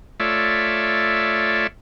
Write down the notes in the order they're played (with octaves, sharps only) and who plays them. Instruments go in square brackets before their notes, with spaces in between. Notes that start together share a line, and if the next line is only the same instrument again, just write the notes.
[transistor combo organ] A3 F4 C#5 D5 E5